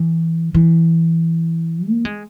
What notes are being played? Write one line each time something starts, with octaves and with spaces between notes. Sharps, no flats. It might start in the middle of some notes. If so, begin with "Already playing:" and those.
Already playing: E3
E3
A#3
G#3